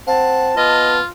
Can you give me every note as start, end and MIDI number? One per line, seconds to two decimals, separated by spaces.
0.07 0.54 60
0.07 0.51 78
0.07 0.99 81
0.57 1.00 59
0.57 1.08 65
0.57 0.93 75